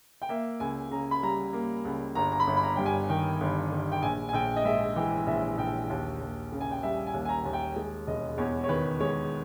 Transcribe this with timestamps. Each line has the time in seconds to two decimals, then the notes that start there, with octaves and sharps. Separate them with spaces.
0.22 G5
0.29 A#3 E5
0.60 C#2 G#5
0.91 C#3 A#5
1.11 B5
1.23 G3 A#5
1.53 A#3
1.85 C#2
2.15 G1 A#5
2.32 A#5
2.40 B5
2.47 G1
2.57 B5
2.63 A#5
2.76 G2 G5
2.86 G#5
3.09 D#3 G5
3.41 G1
3.72 G1
3.92 G5
4.02 A#1 G#5
4.29 G#5
4.33 A#1 G5
4.56 D#5
4.65 G#2 E5
4.96 E3 G5
5.27 A#1 E5
5.58 A#1 G5
5.90 D#2
6.21 D#2
6.52 C#3
6.61 G#5
6.71 G5
6.83 G3 E5
7.07 G#5
7.14 D#2
7.25 G#5
7.29 A#5
7.45 D#2
7.53 G5
7.76 G#3
8.07 E1 D#5
8.38 E2 C#5
8.64 C#5
8.69 D#3 B4
9.00 G#3 C#5